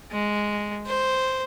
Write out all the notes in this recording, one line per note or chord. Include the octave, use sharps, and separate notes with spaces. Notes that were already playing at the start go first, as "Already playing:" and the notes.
G#3
C5